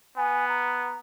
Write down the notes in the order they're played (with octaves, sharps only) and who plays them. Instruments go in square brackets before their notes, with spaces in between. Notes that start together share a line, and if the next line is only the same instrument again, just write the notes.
[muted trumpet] B3 [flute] G#5
[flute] A#5